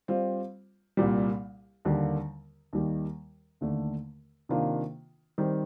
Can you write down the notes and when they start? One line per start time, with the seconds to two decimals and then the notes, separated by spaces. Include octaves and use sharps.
0.08 G3 C4 F4
0.97 C2 A#2 G3
1.85 D#2 D3 G3 A#3
2.73 D#2 D#3 G3
3.61 D#2 D3 A3
4.49 C3 D#3 A#3 D4 F4
5.38 D#3 G3 C4